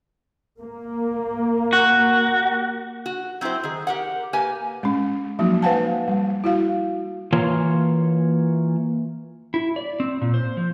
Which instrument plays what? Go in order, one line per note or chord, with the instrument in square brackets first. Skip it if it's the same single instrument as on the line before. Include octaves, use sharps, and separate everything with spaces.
[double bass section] A#3
[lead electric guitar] F#4
[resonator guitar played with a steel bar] F#4
F#3 C4 D#4 E4 C5
D#3 G#4
G4 A#4 F#5
A#3 G4 B4 G#5
[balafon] G#3 C#4
F3 F#3 A#3 D#4 F#4
B4 C5 F5 F#5 G#5 A5
G3
E4 F#4 F5
[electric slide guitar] E3 A#3 F4 C#5
E4
D5
C4
A#2
C5
F3